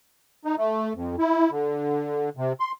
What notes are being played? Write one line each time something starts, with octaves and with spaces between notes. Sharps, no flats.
D#4
A3
F2
E4
D3
C3
C6